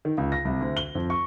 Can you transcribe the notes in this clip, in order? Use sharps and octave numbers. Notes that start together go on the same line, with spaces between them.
D#3
C#2
A#6
C2
D2
G7
F2
C#6